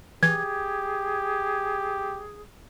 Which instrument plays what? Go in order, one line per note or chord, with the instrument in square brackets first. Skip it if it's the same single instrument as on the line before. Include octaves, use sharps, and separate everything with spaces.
[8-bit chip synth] E3 [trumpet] G4 [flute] G#4 [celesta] G#6